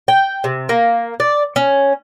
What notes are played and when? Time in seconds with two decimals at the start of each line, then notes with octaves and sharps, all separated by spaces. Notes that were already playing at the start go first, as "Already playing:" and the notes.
0.08 G5
0.44 C3
0.69 A#3
1.20 D5
1.56 C#4